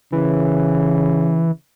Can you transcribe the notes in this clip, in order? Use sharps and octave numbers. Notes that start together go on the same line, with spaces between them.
C#3 E3